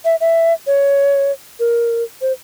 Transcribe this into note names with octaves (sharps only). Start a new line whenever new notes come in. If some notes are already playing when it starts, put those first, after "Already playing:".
E5
E5
C#5
A#4
C5